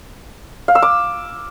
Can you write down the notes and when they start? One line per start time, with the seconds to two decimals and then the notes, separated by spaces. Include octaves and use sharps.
0.68 F5
0.75 E6
0.82 D6